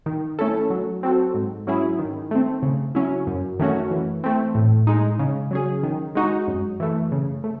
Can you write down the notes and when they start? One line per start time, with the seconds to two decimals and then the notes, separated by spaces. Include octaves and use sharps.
0.06 D#3
0.39 A3 C#4 E4 A4
0.70 F#3
1.03 C4 F#4 A4
1.34 G#2
1.67 F#3 C#4 E4 G#4
1.99 D#3
2.31 A3 C4
2.62 C#3
2.95 F#3 C#4 E4
3.27 F#2
3.59 D#3 A3 C#4 F#4
3.91 E3
4.24 A3 C4
4.55 A2
4.87 G#3 D#4
5.19 C#3
5.51 F#3 C#4 G#4
5.83 D#3
6.15 G#3 D#4 F#4
6.47 F#2
6.80 E3 A3
7.12 C#3
7.44 A3